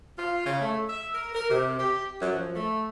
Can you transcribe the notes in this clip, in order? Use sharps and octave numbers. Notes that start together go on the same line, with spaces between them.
F4
C#3
A3
E5
A#4
A#4
C3
G4
F#2
F3
A3